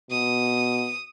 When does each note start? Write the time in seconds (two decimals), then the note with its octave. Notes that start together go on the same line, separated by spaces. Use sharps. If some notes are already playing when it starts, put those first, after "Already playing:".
0.11 B2 D#6